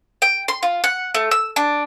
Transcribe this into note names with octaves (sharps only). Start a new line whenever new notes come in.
G5
C6
F4
F#5
A3
E6
D4